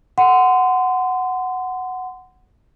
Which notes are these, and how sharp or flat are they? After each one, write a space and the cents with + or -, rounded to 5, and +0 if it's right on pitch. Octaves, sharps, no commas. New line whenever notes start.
F#5 +0 C6 -25